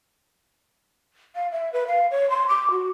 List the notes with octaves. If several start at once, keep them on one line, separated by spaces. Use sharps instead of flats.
F5
E5
B4
F5
C#5
C6
D6
F#4